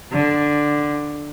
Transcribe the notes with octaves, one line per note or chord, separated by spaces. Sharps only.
D3